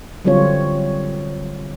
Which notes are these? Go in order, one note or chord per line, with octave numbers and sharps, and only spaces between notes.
D3 F#3 G3 C4 F4 C#5